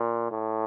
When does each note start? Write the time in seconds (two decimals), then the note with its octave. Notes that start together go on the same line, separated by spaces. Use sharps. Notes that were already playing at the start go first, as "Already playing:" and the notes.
Already playing: A#2
0.31 A2